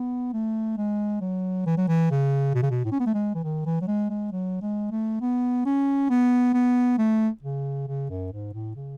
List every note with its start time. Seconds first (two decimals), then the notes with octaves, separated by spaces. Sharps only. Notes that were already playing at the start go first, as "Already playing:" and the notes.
Already playing: B3
0.33 A3
0.77 G#3
1.21 F#3
1.66 E3
1.77 F#3
1.88 E3
2.11 C#3
2.55 B2
2.63 C#3
2.70 B2
2.85 A2
2.92 C#4
3.00 B3
3.06 A3
3.14 G#3
3.35 E3
3.44 D#3
3.66 E3
3.81 F#3
3.87 G#3
4.10 G#3
4.32 F#3
4.62 G#3
4.91 A3
5.21 B3
5.66 C#4
6.10 B3
6.54 B3
6.98 A3
7.43 C#3
7.87 C#3
8.10 F#2
8.32 G#2
8.53 A2
8.76 C#3